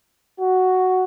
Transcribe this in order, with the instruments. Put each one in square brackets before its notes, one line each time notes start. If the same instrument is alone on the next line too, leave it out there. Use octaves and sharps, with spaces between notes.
[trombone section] F#4